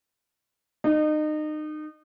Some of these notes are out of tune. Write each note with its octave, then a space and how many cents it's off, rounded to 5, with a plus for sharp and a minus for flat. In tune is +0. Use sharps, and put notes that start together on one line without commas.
D#4 -30